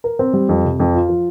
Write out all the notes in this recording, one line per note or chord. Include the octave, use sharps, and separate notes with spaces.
A#4
C4
G3
F2
C3
F2
F4
F3